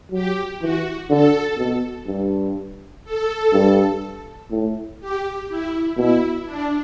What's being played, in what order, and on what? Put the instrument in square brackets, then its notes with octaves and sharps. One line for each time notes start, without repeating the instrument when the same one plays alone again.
[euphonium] F#3 [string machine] G4
[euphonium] E3 [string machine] F#4
[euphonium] D3 [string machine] A4
[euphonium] B2
G2
[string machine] A4
[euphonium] G2
A2
[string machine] G4
E4
[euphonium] B2 [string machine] E4
[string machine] D4